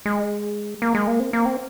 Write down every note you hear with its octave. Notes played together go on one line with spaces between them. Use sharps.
G#3
A#3
G#3
A#3
C4
A#3
C4